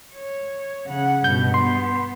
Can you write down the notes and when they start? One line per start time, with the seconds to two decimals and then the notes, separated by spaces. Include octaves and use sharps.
0.13 C#5
0.86 C#3 F#5
1.24 G2 B2 G6
1.54 B3 C6